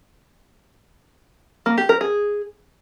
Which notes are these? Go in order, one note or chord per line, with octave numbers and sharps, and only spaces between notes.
A#3
G4
A#4
G#4